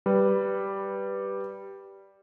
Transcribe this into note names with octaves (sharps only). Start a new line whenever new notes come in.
G3 B4